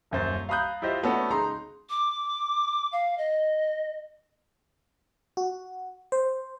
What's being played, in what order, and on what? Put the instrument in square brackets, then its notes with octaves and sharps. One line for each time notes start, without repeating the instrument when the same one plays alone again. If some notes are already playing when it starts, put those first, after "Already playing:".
[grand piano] D#1 F#2 C5 A6
F5 A#5 B5 D#6 F#6 G6
E4 F4 G4 C5 D#5 E5
A3 B3 C#4 D4 F#4 A4
C#3 G#3 D#4 A#5 C6
[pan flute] D6
F5
D#5
[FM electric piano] F#4
C5